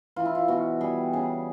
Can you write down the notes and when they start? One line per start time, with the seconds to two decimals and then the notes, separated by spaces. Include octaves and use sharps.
0.16 E3 F4
0.26 E4
0.35 F4
0.48 B2 F#4
0.81 G3 G#4
1.13 C#3 G#4